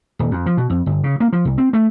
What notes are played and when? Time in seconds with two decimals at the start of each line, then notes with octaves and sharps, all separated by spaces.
0.19 D#1
0.31 F2
0.46 F3
0.57 B2
0.70 F2
0.86 G1
1.04 C#3
1.20 A#3
1.33 F3
1.45 C2
1.58 C4
1.73 A3